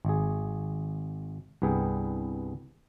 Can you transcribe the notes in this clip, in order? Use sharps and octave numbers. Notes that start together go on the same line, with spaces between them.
G#1 G#4
C2 G2 B3 G#4 G5